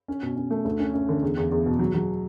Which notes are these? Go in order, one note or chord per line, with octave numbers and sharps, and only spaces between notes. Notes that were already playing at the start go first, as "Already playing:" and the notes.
C#4
B2
C#4
A3
D2
C#4
C#4
D3
E2
E2
E2
B2
F#3
F#3